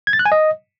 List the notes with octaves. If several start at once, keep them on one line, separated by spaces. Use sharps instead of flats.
G#6
A6
F#6
G#5
D#5